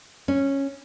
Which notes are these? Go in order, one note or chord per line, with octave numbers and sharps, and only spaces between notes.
C#4